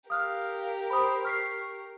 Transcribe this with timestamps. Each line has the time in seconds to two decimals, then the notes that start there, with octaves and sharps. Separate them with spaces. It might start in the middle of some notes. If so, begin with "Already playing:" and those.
0.10 G4 A#4 F5 D#6 F6 F#6
0.90 C5 B5 D#6
1.25 C#6 F6 B6 C7